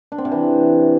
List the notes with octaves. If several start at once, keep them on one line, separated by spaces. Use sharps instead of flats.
D4
C4
C3
E3